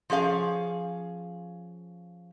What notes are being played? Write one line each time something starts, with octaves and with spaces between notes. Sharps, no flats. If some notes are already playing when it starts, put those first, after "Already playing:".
F3 C#4 G#4 F5